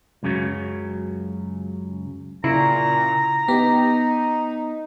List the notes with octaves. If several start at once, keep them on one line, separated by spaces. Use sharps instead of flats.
C#2 F#2 C#3 F#3
A#2 C#3 E4 A#5
B3 D#4 G4